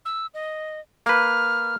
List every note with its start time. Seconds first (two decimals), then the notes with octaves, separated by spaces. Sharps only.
0.05 E6
0.34 D#5
1.06 A#3 B4 F6